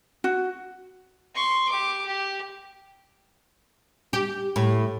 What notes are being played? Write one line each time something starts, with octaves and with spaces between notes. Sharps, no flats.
F#4
C6 C#6
G4 D6
G4
G4
A2